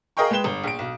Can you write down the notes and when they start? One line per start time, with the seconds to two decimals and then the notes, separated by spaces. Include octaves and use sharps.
0.17 G#4 A#4 D#5 F5 G5 C#6
0.31 G#3 B4 G5 E7 G7
0.44 G1
0.64 A#1 D7
0.79 B1